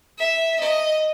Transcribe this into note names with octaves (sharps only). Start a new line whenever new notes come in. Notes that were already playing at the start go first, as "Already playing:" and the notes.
E5
D#5